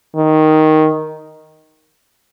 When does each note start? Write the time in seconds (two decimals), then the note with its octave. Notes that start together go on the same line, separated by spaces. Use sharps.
0.16 D#3